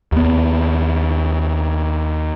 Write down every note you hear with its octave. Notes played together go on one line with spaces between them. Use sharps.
D#2 B3